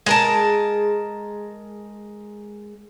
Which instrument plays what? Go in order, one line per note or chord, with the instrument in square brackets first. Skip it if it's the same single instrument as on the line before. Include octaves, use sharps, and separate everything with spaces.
[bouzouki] G#3 A#4 A5